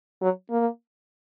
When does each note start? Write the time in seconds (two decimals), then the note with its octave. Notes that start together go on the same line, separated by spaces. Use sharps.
0.21 F#3
0.50 A#3